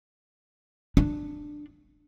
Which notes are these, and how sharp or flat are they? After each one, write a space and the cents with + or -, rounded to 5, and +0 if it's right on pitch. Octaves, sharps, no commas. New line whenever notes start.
D4 +10